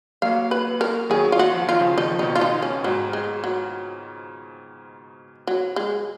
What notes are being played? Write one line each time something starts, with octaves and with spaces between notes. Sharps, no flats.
F#3 A#3 F5
B4
A#4
D#3 F#3 G#4
F4
F#4
F3
D#3 F4
C#3 F3
D#3 D#4
F3
B2 D#3 D#4
F4
D#4
C#4
G#2 F#3
G#3
F#3
F#3
G#3